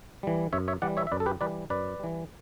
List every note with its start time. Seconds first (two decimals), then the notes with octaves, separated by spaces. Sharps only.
0.23 E3 G3
0.53 F#2 C#5 E5
0.68 C#5 E5
0.82 E3 G3 D5 F#5
0.97 C#5 E5
1.07 E5
1.12 F#2 B4 D5
1.20 A4
1.26 G4 B4
1.41 E3 G3 B4 D5
1.70 F#2 B4 D5
2.00 E3 G3